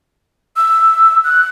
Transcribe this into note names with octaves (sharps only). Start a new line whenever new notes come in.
E6
F#6